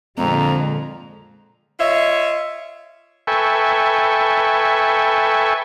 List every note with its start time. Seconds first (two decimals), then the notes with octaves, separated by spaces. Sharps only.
0.18 F2 A#2 D3 G#3 C4 A#5
1.80 F4 C#5 D#5 E5
3.27 A4 B4 E5 G5 G#5 C#6